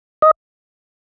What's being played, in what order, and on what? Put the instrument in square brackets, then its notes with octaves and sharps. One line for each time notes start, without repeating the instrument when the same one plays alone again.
[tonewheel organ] D#5